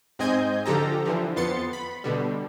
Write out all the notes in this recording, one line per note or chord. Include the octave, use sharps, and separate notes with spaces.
G#2 C4 D#5 G#5 G6
D3 F3 G4 A4 A#5
D3 E3 F3
F2 B3 C6 A6 C#7
B5
B2 D3 G3